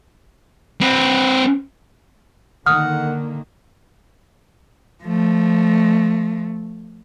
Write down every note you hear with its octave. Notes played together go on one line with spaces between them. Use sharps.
C4 B4
D3 D#3 A#3 F#5 D#6 F6
F3 A3